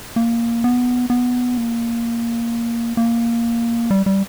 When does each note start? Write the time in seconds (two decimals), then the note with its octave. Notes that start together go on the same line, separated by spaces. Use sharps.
0.16 A#3
0.64 B3
1.10 B3
1.57 A#3
2.97 A#3
3.91 G3
4.06 G3